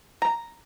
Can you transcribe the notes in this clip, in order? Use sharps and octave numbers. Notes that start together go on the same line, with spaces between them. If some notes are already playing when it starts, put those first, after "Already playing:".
A#5